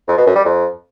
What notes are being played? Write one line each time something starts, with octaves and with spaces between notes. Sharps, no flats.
F2
B2
F#2
G3
F2